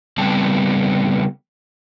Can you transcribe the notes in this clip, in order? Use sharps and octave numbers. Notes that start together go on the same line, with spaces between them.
C#3 G3 A3 B3 C4 A5